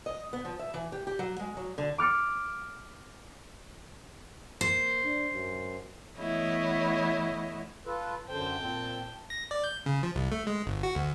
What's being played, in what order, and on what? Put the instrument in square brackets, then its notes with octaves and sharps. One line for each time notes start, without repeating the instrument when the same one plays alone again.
[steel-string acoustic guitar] D#5
B3
F3
E5
E3
G4
G4
F#3
G#3
F#3
D3
[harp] D6 F6 A6 C#7
[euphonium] A#3 [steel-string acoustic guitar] C5
[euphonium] D4
F#2
[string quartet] E3 A3 B3 E4 C#5 D#5
[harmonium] F4 A4 B4
[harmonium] F#2 D3 C5 [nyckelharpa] G5 A5
[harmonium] A#2 C4
[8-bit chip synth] A#6
D5
G6
C#3
F3
C2
A3
G#3
G1
F#4
D2